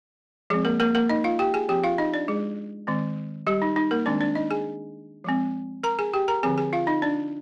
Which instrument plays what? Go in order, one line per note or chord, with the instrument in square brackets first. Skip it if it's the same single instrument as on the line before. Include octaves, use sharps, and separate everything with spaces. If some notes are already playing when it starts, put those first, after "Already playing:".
[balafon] F3 G#3 C4 G#4
A#3 A#4
A#3 A#4
A#3 A#4
D#4 D#5
F4 F5
G4 G5
G#4 G#5
F3 C4 G4 G5
F4 F5
D#4 D#5
D4 D5
G#3 G#4
D#3 G#3 C4
G3 G4
D#4
D#4
A#3 A#4
D#3 G#3 C4 D4 D5
D4 D5
D#4 D#5
G#4 G#5
F3 G#3 C4
A#4 A#5
G#4 G#5
G4 G5
A#4 A#5
D3 F3 C4 G#4 G#5
G#4 G#5
F4 F5
D#4 D#5
D4 D5